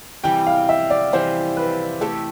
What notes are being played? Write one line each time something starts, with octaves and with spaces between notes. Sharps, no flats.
C3 E3 G3 G5
F5
E5
D5
C3 E3 G3 C5
B4
A3 E4 G4 A4